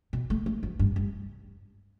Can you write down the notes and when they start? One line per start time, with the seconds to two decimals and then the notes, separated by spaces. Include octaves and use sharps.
0.13 B2
0.30 A3
0.46 A3
0.63 F3
0.79 G2
0.96 G2